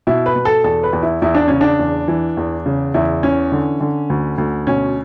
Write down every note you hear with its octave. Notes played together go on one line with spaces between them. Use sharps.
B2 E4
B4
B2
A4
E2 A4
B4
E2
E4
E2 E4
D4
C#3 C#4
D4
E2
E3
E2
C#3
E2 E4
E3 C#4
D3
D3
D2
D2
B2 C#4